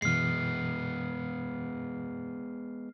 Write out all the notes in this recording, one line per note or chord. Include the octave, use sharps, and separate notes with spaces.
F#2 B2 E3 G#3 B3 F6 C7